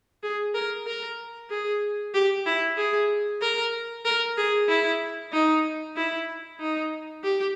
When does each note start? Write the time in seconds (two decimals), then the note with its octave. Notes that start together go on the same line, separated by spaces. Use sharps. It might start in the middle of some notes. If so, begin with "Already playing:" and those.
0.23 G#4
0.54 A#4
0.86 A#4
1.50 G#4
2.14 G4
2.46 E4
2.77 G#4
3.42 A#4
4.05 A#4
4.37 G#4
4.68 E4
5.32 D#4
5.96 E4
6.60 D#4
7.23 G4